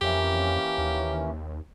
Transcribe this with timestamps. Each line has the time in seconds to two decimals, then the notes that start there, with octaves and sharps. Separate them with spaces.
0.01 F2 E3 A#3 C#4 G4
0.78 D#2